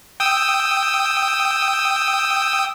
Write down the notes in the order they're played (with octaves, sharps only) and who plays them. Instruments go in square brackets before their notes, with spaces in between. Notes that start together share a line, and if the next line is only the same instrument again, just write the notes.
[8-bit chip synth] G5 D#6 E6